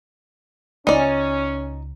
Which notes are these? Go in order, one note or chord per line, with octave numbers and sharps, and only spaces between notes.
C#2 C#4 D#4 D5